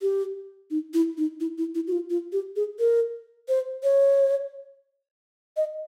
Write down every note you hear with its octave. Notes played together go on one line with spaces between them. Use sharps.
G4
D#4
E4
D#4
E4
E4
E4
F#4
F4
F4
G4
G#4
A#4
C5
C#5
D#5